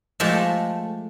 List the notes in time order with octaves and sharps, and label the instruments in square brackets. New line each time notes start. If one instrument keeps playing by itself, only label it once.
[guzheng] F3 G#3 A3 G4 A4 E5